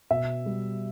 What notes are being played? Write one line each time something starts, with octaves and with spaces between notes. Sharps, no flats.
B2 E5
G3